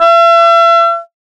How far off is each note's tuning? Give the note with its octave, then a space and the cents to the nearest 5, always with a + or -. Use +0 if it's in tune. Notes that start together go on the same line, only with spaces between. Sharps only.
E5 +40